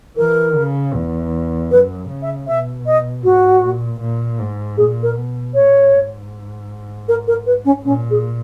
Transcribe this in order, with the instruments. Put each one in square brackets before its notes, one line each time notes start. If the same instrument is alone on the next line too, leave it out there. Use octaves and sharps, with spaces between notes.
[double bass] E3 [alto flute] A#4
[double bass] C#3
E2
[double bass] F#2 [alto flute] B4
[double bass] C#3
[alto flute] E5
[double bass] B2 [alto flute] E5
[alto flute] D#5
[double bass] G#2 [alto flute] F#4
[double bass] A#2
A#2
G#2
[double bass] A#2 [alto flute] G#4
[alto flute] A#4
[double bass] B2
[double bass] A#2 [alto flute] C#5
[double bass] G#2
[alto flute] A#4
A#4
B4
C#4
[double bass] A#2 [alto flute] C#4
[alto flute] G#4